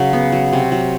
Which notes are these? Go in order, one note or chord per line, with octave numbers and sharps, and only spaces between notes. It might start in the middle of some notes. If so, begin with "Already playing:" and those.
Already playing: C#3 F#3
B3
F#3
C3
F#3